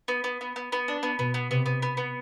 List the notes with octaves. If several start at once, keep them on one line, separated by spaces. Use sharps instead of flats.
B3
B3
B3
B3
B3
D4
B3
B2 B3
B3
C3 B3
B3
B3
B3